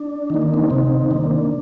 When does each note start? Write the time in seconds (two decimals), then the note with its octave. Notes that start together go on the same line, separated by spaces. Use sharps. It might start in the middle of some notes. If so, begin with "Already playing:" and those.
Already playing: D4
0.30 D#3 A#3 D#4
0.42 D4
0.54 C4 D#4
0.70 C3 C4 D#4
1.11 D#3 A#3 D4